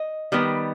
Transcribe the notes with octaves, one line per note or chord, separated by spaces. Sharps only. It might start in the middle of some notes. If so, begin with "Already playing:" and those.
Already playing: D#5
D#3 G3 B3